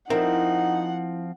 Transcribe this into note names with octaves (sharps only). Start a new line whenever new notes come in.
F3 C4 D#4 E4 A#4 F#5